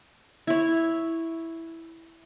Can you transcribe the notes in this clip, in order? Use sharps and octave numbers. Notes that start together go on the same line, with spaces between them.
E4 C#5